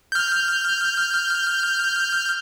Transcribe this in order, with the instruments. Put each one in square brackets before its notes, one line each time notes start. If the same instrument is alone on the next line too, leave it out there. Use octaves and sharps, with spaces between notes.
[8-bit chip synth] F6 G6